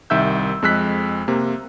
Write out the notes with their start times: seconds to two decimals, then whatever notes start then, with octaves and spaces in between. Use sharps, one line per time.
0.10 C2 D#3 E5 E6 G6
0.62 F2 G#3 E6 F#6 B6
1.28 C3 A#3